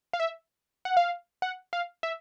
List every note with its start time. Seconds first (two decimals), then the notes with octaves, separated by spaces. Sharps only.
0.13 F5
0.20 E5
0.85 F#5
0.97 F5
1.42 F#5
1.73 F5
2.03 E5